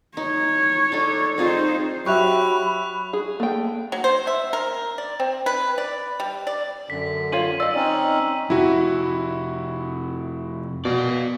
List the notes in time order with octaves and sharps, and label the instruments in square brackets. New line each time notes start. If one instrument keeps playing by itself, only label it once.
[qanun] D#4 [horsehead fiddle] C#5
[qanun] D4 D#4 A4
[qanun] C4 F4 G#4 [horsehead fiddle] D#4 C5
[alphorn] F#3 [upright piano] G4 E5 [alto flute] B5 [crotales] C#6 F#6 F7
[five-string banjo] G#4
[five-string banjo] A3 G5 [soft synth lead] A#3
[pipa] F#3
C5
E5
A#4
D5
C4
B4
D5
G3
D5
[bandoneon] F#2 D3 [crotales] B6
[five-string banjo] F4 C#5 F5 [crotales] D#7 F#7
[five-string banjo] D5 D#5 [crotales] E6
[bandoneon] C4 C#4 D#4
[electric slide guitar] F2 C3 [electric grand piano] E4 F#4
[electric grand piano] B2 [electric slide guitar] D5 F5